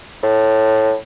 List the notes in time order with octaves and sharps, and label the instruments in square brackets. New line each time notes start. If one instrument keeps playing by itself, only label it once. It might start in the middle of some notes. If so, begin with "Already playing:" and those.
[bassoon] A2